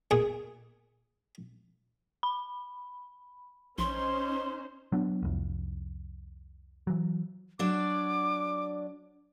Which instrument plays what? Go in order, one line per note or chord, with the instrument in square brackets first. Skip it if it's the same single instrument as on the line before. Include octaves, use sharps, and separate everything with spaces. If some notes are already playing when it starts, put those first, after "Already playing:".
[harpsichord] A#2 G#4
[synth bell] B5
[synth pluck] A#1 [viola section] C#4 D#4 C5 [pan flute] C6
[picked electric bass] F#3 B3 D4
C2 F2
E3 F#3
[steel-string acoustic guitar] F#3 D4 D5 [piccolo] D6